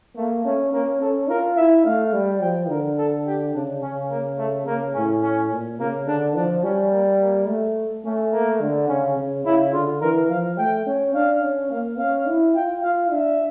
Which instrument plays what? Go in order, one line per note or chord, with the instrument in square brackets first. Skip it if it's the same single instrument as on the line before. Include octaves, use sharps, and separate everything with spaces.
[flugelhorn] A3 [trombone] A#3
[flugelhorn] A3 [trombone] C#4
[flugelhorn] A#3 [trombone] C#4
[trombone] C#4 [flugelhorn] A4
[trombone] F4 [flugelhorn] A#4
[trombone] E4 [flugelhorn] E5
[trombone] A3 [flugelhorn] F5
[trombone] G3
[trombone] F3 [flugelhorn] G5
[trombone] D3 [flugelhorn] A#4
[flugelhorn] A4
G4
[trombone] C#3 [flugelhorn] D4
[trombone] C#3 [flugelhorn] C#4
[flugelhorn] A#3
A3
[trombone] C#3 [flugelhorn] A#3
[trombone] A2 [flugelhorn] C#4
[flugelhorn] C#4
[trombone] A#2
[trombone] C#3 [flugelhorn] A#3
[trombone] D3 [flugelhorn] D4
[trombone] F3 [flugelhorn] D4
[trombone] G3 [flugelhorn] C#4
[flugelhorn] A#3
A#3
[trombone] A3
[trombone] A3 [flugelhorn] C#4
[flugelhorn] A#3
[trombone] D3
[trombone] C#3 [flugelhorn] C#4
[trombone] C#3
[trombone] C#3 [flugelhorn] E4
[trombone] D3 [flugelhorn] F4
[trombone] E3 [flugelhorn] A#4
[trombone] F3 [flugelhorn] F5
[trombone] A3 [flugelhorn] G5
[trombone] C#4
[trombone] D4 [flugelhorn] F5
[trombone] C#4
[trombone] A#3 [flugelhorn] F5
[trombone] C#4 [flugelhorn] F5
[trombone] E4
[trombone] F4 [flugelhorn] G5
[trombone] F4 [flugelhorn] F5
[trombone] D4 [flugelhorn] E5